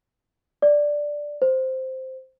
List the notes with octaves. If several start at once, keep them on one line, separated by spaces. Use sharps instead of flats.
D5
C5